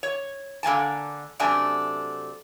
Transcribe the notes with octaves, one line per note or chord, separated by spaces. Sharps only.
C#5
D3 A#3 G#5 A5
F#2 C3 A3 D4 G#5